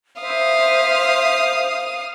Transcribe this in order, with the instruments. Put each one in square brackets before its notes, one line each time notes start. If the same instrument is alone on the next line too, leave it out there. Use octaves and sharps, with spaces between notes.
[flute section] C5 E5 [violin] F5 D#6